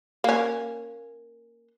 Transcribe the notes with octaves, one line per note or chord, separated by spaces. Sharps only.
A#3 C#4